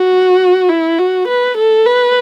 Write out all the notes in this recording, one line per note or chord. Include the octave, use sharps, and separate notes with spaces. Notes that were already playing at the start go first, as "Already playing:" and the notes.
Already playing: F#4
E4
F#4
B4
A4
B4